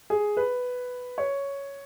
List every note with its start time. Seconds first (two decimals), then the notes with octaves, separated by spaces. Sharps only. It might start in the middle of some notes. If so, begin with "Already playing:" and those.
0.10 G#4
0.37 B4
1.18 C#5